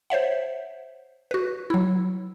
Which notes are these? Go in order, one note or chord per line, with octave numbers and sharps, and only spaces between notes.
C5 C#5 E5 F#5
F#4 B4
F#3 E4